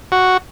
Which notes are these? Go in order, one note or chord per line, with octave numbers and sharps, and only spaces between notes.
F#4